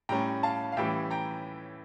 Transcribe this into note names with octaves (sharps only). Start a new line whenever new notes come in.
A2 G3 C#4 G5 A#5
F5 A5
F5
A2 E3 G3 C#4 E5 G5
G5 A#5